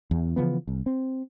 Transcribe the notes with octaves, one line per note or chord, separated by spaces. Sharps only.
E2
C#3 E3 F3 B3
C2
C4